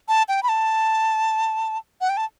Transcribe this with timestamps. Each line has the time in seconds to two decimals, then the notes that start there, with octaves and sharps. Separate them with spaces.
0.08 A5
0.28 G5
0.43 B5
0.49 A5
2.01 F#5
2.09 G5
2.17 A5